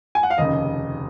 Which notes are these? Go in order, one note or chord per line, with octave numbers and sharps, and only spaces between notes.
G#5
F#5
F5
F1 D#2 C#3 D#5